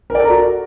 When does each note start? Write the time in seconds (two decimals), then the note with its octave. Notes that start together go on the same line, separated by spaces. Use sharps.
0.10 A#4
0.15 D5
0.20 A4
0.25 A#5
0.30 F#4